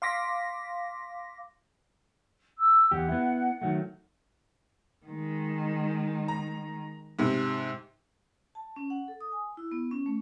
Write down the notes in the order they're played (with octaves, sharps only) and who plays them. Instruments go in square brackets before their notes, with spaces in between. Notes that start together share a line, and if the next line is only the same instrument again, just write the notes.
[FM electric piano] F5 C6 D6 A#6 B6
[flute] E6
[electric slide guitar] E2 G4 [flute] F#5
[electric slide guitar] B3 E4
D#3 F#3 A3
[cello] D#3 G#3
[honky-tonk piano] A#5
G#2 C3
[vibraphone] A5
C#4
F#5
A4
D#6
G#5
E4
B3
C#4
A3